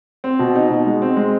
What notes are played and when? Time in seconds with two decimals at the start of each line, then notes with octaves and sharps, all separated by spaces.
0.24 C4
0.39 B2
0.55 D#4
0.70 B2
0.86 G#3
1.02 C4
1.17 G#3